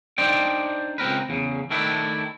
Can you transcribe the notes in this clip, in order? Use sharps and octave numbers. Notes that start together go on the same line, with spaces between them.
D4 D#4 C5 D5 G5
C#2 C4 A#4 B4
E2 C#3
D#3 A3 D4 E4